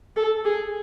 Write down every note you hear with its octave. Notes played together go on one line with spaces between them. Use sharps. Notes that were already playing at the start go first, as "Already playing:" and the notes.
A4
G#4